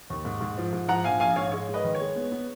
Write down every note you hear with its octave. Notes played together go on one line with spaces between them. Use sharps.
D#2
G#2
G#2
F3
G#2
F3 F#5 A#5
A#1 F5 G#5
A#1 F5 G#5
G#2 C#5 F5
G#3 C#5
G#3
B4 D#5
D#3
C#5
G#3
B3
B3